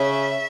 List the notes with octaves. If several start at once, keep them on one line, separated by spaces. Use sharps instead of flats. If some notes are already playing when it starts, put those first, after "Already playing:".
Already playing: C#3 C#4 E5